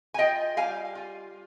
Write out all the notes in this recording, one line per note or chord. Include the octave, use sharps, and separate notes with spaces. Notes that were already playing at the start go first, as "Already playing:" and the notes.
G#5
F4 D#5 G5
G3 F5 G#5
F4